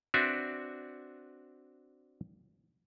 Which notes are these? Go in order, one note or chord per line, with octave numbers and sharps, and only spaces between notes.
C4 D4 F#4 B4 D5 E5